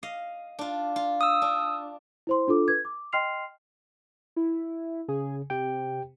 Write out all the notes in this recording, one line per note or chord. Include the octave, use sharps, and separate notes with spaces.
D#5 F5
D4 F4
F4
D#6 E6
D4
E4 C5 C6
D4 F4 A4 D6
B4 G#6
D6
D#5 G5 C6 F6 C7 F7
E4
C#3 G#4
C3 G4 G5